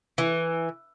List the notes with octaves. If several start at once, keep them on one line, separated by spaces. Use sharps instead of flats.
E3